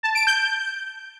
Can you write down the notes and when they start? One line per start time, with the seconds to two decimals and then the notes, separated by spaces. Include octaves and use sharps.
0.03 A5
0.15 D7
0.27 G6